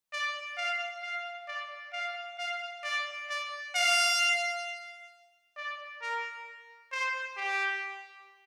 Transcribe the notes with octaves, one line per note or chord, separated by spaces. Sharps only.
D5
F5
F5
D5
F5
F5
D5
D5
F5
D5
A#4
C5
G4